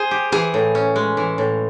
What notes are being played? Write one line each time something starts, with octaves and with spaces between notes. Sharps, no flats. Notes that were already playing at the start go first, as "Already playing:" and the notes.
Already playing: G#4 C5
G4
E3 G#4
A2
C#4
G#3
E3
A2